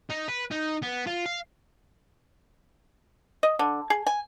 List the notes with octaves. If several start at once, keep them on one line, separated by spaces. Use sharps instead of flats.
D#4
B4
D#4
B3
F4
F5
D#5
D3
G#4
G#5